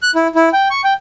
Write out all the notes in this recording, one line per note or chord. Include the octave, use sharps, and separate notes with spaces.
F#6
E4
E4
G5
C#6
G5